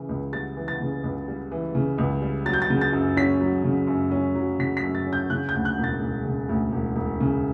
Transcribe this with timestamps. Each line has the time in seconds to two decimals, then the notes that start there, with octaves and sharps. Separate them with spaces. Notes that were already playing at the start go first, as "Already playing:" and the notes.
Already playing: C#3 E3
0.09 C#2
0.33 G3 A6
0.57 E3
0.68 A6
0.81 C#3
1.04 C#2
1.28 G3
1.52 E3
1.75 C#3
1.98 C#2
2.22 G3
2.46 F#3 A6
2.53 G6
2.62 A6
2.70 C#3
2.81 A6
2.93 F#2
3.17 C#4 B6
3.40 F#3
3.64 C#3
3.88 F#2
4.11 C#4
4.35 F#3
4.59 C#3 B6
4.77 B6
4.83 F#2
4.95 A6
5.07 C#4
5.13 G6
5.30 C#3 F#6
5.49 G6
5.55 D2
5.65 F#6
5.78 E1
5.84 A6
6.01 E1
6.25 C#3
6.49 D2
6.72 E1
6.96 E1
7.20 C#3